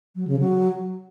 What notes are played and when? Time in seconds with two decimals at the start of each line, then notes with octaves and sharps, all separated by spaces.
0.16 F#3
0.28 C#3
0.39 F#3